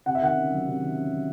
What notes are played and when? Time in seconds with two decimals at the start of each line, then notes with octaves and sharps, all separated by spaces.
0.06 C3 F#5
0.15 E5
0.21 D#3 F#5
0.36 C#4
0.52 F#3
0.66 C3
0.81 D#3
0.96 C#4
1.12 F#3